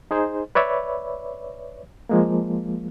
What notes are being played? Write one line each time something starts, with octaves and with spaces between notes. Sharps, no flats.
D#4 G#4 C5
B4 C#5 D5 E5 B5
F3 G#3 A#3